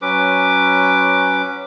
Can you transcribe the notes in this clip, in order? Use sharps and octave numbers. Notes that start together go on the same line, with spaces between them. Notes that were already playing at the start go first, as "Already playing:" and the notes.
F#3 C#4 B4 D6